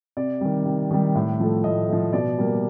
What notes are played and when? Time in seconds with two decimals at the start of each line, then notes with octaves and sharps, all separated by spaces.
0.17 C3 D5
0.41 D#3 G3
0.66 C3
0.91 D#3 G3
1.15 A2
1.40 F3 A3
1.64 A2 D#5
1.88 F3 A3
2.13 B2 D5
2.38 G3 A#3